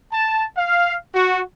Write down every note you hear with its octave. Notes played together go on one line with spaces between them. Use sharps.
A5
F5
F#4